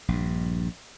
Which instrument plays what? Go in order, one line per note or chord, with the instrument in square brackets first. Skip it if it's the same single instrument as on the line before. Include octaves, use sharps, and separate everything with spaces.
[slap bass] A#1 G2